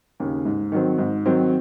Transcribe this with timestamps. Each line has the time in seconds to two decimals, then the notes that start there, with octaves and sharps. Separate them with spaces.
0.20 D#2 C#3
0.45 G#2
0.72 D#3 F#3 C4
0.98 G#2
1.26 D#3 F#3 C4